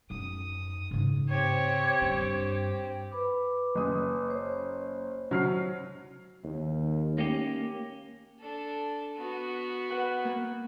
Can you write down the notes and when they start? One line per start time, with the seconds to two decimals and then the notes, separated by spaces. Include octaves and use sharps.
0.10 F#2 D#4 D#6
0.91 G#2 C#3
1.29 C4 G4 C#5
2.01 G2 D4
3.12 B4 B5 D6
3.75 F#1 D#6
4.28 C5 C#5
5.31 F#3 F6 C7
6.44 D#2
7.18 A#3 C#4 G4
8.39 D4 A4
9.17 B3 F#4
9.90 B4 F#5
10.25 A#3